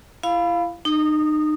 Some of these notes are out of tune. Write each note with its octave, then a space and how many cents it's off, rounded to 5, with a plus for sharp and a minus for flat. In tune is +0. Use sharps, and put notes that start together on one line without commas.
E4 +35 F5 +0 B5 +5
D#4 -35 D#6 -15